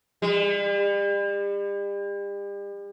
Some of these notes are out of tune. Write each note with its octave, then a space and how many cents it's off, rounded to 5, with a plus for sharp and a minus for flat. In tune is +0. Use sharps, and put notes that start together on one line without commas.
G3 +40